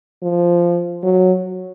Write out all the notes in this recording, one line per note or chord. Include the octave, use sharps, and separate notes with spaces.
F3
F#3